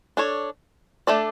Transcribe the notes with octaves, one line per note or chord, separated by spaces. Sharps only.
D4 A4 C#5
A3 D4 A4 D5